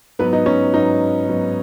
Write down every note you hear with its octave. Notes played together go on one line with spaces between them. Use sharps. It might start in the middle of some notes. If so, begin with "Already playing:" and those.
G#2 F#3 B3 B4
D#4
C#4
G#2 F#3 B3 D#4
G#2 F#3 B3